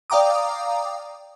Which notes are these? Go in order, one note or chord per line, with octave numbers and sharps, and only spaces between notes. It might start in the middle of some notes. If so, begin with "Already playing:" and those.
D5 F5 G5 A#5 D6 D#6